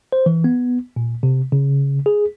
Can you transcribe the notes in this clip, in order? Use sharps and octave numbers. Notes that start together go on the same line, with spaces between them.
C5
E3
B3
A#2
C3
C#3
G#4